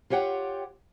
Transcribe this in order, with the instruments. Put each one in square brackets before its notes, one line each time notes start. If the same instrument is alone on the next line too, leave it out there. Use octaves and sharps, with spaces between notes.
[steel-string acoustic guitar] F4 G4 C#5 F#5 G5